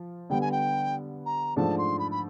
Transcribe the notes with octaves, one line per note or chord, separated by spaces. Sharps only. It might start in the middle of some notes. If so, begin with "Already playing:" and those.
Already playing: F3 F4
D3 G3 B3 G5
G#5
G5
A#5
G#2 F3 A3 D4 A5
C6
B5
B5